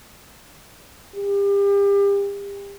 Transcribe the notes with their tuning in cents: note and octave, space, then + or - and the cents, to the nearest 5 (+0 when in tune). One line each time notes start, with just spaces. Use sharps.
G4 +35